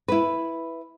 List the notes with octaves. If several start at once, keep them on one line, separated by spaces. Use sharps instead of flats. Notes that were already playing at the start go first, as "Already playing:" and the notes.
E4 B4